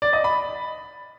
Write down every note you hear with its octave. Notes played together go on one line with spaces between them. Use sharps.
D5
D#5
B5